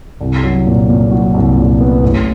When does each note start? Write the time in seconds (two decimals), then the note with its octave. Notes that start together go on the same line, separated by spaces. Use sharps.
0.21 C2
0.44 F#3
0.66 A#2
0.89 A#2
1.11 F#3
1.34 C2
1.56 A#2
1.80 B3
2.03 A1